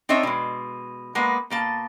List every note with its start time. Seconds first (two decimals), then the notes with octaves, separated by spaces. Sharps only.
0.09 C4 D4 D#4 C#5 D#5 E5
0.23 B2 G#3
1.15 G#3 A#3 B3
1.50 B2 A#3 A5